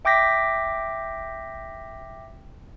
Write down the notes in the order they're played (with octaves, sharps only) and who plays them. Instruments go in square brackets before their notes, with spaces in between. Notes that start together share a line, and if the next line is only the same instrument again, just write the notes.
[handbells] E5 G5 D6 G6 A#6 B6